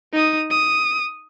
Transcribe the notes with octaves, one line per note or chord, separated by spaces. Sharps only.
D#4 D#6
D#6